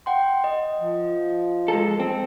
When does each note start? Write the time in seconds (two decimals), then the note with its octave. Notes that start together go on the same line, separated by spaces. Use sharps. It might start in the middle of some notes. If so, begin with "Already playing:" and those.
0.06 F#5 G5 C6
0.44 D#5
0.80 F3
1.68 G#3 A4
2.00 C4